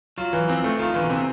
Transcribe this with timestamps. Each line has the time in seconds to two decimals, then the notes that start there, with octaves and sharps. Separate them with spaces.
0.18 F#3 F4
0.33 E3
0.48 F3 C4
0.64 A3
0.79 D#3 F4
0.94 D3 E3
1.04 B2
1.10 C3 C4